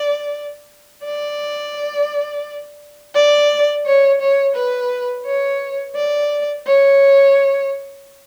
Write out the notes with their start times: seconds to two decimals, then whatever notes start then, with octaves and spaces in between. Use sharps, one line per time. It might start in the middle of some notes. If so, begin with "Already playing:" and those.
Already playing: D5
1.05 D5
3.15 D5
3.86 C#5
4.21 C#5
4.55 B4
5.26 C#5
5.96 D5
6.66 C#5